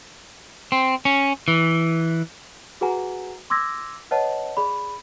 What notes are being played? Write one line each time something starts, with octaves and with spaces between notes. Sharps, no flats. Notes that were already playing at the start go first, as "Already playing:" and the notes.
C4
C#4
E3
F#4 G#4 B4 F#5 G#5 A#5
C6 D6 E6 G#6 A#6
B4 C#5 D#5 F#5 A5
G#4 D5 B5